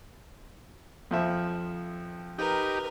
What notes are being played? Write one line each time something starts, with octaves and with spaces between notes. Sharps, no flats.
F2 F3 E5
D#4 G4 A#4 B4